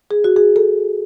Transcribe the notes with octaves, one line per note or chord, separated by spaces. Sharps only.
G#4
F#4
G#4
A4